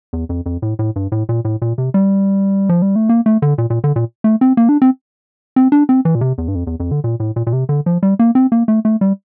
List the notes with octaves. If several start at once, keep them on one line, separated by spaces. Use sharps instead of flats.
E2
F2
F2
A2
A2
G2
A2
A#2
A2
A#2
C3
G3
F3
G3
A3
A#3
A3
D3
A#2
A#2
D3
A#2
A3
C4
A#3
D4
C4
C4
D4
C4
E3
A#2
C3
E2
G2
F2
E2
F2
D3
A#2
A2
A#2
A#2
C3
D3
F3
G3
A#3
C4
A#3
A3
A3
G3